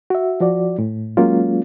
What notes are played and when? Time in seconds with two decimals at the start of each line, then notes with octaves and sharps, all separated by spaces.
0.10 F#4 E5
0.40 F3 F#4 D5
0.79 A2
1.17 F#3 G#3 A#3 C#4 F4